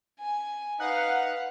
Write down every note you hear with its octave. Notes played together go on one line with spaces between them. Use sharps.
G#5
D#4 B4 F5 F#5